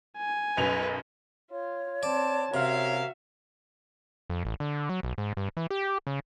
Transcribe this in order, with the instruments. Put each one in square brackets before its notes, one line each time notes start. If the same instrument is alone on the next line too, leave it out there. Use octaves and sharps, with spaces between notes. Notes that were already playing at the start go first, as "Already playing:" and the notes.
[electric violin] G#5
[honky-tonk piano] B1 F#2 F7 [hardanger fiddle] B4
[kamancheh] F4 [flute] C#5
[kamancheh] C4 A5 [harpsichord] D5
[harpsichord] C3 [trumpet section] C#4 A#4 F5 [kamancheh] F#4 E5
[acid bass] F2
A1
D3
F#3
B1
G#2
G2
E3
G4
C#3